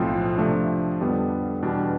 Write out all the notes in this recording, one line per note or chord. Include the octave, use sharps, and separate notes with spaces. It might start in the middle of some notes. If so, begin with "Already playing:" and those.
Already playing: B1 A2 F3 C4 F4
C3 F3 A3 D4
F2 D3 G3 B3
E2 B2 G3 D4